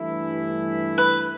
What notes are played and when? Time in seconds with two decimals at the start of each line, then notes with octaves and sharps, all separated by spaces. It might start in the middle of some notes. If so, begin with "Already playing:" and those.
Already playing: G2 E3 A3 E4
0.98 B4